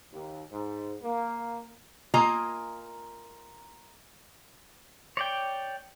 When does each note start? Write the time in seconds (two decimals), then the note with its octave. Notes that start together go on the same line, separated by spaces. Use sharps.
0.12 D#2
0.51 G#2
1.02 A#3
2.14 A#3 F4 D#5 G#5 A#5
5.17 C#5 D5 G5